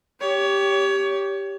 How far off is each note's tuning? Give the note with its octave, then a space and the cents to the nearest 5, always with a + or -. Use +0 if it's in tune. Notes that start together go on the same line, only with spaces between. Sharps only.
G4 +0 C#5 +25